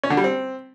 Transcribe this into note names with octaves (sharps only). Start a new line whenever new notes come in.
C#4
D3
G3
C4